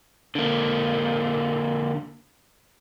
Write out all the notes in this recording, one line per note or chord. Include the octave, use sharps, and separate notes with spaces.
D3 A#3